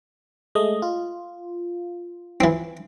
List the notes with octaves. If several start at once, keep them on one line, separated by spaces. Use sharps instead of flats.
G#3 A3 D#5
F4
E3 C4